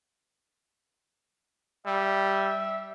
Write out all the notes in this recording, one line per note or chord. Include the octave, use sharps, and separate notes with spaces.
G3 E5